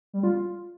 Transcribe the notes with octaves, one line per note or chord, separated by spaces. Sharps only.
G3
F4